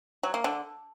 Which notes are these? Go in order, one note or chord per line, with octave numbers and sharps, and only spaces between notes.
F#3
A#3
D3